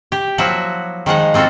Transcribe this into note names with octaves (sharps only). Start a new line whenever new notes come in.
G4
F3 F#3 A#3 E4 F#4
D#3 F3 G#3 F#5
A#3 C4 F4 F#4 A4